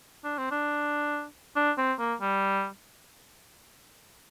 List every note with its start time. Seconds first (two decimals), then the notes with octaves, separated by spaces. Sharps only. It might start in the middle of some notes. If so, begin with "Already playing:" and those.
0.24 D4
0.38 C4
0.51 D4
1.56 D4
1.78 C4
1.99 A#3
2.21 G3